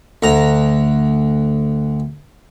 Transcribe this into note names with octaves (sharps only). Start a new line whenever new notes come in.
D2 A#5